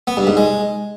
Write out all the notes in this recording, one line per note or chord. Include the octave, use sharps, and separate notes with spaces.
B3
G2
G#2
G#3